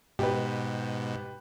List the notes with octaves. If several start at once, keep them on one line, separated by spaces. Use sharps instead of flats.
G#2 B2 G4 B4